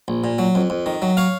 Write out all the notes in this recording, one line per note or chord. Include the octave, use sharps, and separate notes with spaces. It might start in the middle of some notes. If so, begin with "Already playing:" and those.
A#1
A#2
F#3
F2
F2
D#3
F#3
C#5 F5